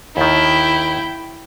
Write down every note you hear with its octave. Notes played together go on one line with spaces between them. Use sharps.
D#2 D#3 E4 G5